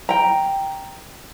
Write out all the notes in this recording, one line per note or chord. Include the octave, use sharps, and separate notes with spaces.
G5 A#5